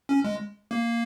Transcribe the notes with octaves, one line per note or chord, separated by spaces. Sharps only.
C#4
G#3
A#3